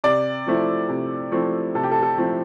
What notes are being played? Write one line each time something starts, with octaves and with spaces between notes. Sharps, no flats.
C3 D5
F3 A3 C4 E4
C3
F3 A3 C4 E4
C3 A4
G4
A4
A4
F3 A3 C4 E4